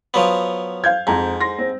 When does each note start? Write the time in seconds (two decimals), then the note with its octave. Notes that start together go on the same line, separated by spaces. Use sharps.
0.14 F3 F#3 B3
0.84 F5 G6 G#6
1.07 F2 G#2 A#5
1.41 C6 A#6
1.59 C4